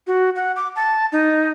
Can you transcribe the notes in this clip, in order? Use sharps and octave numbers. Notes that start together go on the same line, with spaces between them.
F#4
F#5
D6
A5
D#4